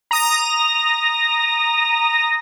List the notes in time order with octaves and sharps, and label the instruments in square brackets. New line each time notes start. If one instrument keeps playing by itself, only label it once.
[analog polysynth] A#5 D#6 A#6